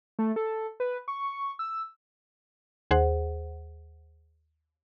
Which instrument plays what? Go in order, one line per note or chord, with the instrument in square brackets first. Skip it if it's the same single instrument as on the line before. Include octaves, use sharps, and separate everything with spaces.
[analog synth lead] A3
A4
B4
C#6
E6
[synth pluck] D#2 G#4 C5 F#5